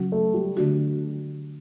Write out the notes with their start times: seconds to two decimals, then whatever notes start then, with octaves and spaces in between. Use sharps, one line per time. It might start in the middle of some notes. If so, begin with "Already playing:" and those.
Already playing: C#3 F#3 C#4 F#4
0.12 A3
0.34 G3
0.57 D3 A3 D4 F#4